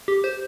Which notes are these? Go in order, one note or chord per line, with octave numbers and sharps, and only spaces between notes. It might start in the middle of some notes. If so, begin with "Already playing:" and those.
G4
C5